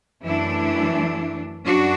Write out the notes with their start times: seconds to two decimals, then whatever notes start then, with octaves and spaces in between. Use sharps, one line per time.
0.23 F#2 E3 A3 D4 E4
1.66 F#2 D4 F#4